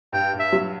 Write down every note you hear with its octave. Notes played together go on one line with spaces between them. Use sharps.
G2 G5
G2
E5
F#3